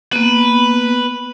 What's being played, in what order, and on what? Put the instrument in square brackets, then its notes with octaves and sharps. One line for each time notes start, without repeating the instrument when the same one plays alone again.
[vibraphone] A#3 B3 [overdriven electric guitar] B4